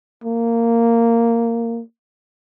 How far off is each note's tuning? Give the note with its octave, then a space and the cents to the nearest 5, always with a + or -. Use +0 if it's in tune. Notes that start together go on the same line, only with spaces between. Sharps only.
A#3 -10